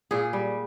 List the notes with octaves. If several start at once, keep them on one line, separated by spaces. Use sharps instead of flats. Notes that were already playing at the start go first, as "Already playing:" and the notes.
A#2 G#4
G3